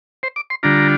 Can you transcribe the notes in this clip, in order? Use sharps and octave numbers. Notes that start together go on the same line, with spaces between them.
C5
D6
C6
D3 G3 D4 F4 A#5